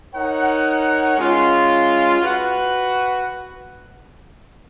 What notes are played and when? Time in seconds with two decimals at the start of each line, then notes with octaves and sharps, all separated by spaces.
0.12 D#4 A#4 C#5 F#5
1.18 G#3 C#4 F4
2.22 F#4 B4 F#5